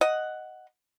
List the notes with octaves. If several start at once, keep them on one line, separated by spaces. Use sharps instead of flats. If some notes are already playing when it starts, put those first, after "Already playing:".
D#5 F#5